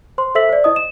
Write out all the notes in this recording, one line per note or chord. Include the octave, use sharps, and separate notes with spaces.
C5 C6
A4 C5 E5 E6 B6 F#7
C5 D5
E4 D#5 D#6
E7